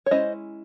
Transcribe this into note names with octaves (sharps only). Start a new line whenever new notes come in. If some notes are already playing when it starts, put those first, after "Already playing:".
C#5
G#3 C#4 E4 C5 D#5